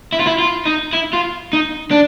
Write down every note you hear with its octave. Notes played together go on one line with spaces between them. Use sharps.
E4
F4
E4
F4
D#4
E4
F4
D#4
D4